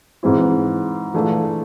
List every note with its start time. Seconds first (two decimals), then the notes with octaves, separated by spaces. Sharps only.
0.23 G#2 E3 G#3 C4 E4
1.14 E3 A3 D4 F4 G#4